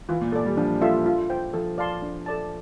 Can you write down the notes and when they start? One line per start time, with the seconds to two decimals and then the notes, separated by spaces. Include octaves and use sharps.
0.09 E3 F4
0.21 A#2
0.32 A#2 A4 D5
0.45 G3
0.57 F3 D4
0.82 F4 A4 E5
1.06 F4
1.30 C5 G5
1.54 F3 A4
1.78 D5 F5 A5 C6
2.02 D4
2.26 A4 D5 A5